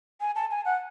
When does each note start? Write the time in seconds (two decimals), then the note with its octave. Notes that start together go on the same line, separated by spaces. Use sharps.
0.21 G#5
0.36 A5
0.51 G#5
0.65 F#5